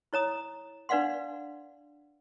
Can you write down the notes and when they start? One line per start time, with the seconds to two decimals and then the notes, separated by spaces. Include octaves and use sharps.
0.13 E4 C#5 A#5 D#6
0.89 D4 B4 D5 F5 F#5 C6